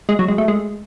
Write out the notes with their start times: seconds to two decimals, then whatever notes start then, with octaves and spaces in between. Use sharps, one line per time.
0.09 G#3
0.19 F#3
0.28 G#3
0.38 A3
0.48 G#3